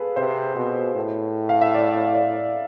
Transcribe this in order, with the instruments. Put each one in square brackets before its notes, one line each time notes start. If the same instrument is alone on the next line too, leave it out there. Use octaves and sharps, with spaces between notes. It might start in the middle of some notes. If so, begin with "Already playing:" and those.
Already playing: [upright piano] F4 G#4 A4 B4
[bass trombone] C3 [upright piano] C5
[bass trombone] B2
A2
[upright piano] F5
E5
D5
D5